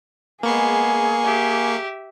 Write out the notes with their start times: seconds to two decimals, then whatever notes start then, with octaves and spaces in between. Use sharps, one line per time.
0.43 G#3 A#3 B3 G#4 C#6 C7
1.24 G4 E5